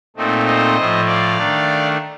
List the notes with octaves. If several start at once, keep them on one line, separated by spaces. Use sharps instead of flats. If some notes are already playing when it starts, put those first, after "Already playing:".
A#2 A3 C4 D#4
C5 D#5
A2 F3 A3
D5 F5
D#3 A3 D4